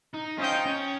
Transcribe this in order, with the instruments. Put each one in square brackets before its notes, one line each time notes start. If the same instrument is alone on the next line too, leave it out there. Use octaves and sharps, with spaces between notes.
[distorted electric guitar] D#4
[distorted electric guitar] C#4 [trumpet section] F4 C5 D#5 G5
[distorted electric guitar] D#4
C#4